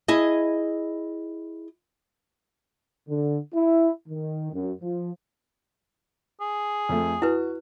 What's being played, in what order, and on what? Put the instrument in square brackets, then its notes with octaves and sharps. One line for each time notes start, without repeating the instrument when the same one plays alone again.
[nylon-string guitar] E4 G#4 D#5
[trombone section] D3
E4
D#3
F#2
F3
[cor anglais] G#4
[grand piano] F2 F3 A3
[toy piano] E4 B4 [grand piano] F#4